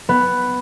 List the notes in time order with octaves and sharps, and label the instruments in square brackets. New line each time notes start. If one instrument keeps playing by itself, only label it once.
[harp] B3